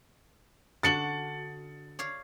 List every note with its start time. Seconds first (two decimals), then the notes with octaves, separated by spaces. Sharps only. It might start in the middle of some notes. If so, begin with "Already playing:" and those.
0.83 D3 D4 F#4 A6 C#7 F#7
1.99 C#5 D5 F5